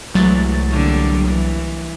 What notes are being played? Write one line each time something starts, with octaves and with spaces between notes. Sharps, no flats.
C2 E3 F#3 G#3 A3 A6
D3 G3 A#3
E3